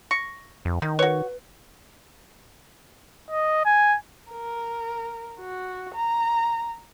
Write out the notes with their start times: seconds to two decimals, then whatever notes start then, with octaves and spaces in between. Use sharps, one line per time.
0.11 C#6 A#6
0.65 F2
0.82 D#3 D#4
0.99 F#4 B4 C#5
3.31 D#5
3.65 G#5
4.32 A#4
5.41 F#4
5.94 A#5